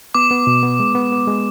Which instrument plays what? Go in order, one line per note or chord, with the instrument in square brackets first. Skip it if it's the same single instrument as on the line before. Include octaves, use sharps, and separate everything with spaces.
[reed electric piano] B3 [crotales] D6
[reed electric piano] B3
B2
B3
G#3
B3
B3
G#3